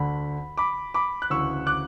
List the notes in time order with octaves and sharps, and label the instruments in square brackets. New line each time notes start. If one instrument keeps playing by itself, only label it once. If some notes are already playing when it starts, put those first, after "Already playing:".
Already playing: [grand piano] D2 D3 B5
B5 D6
B5 D6
F#6
D2 C#3 E3 C#6 E6
D6 F#6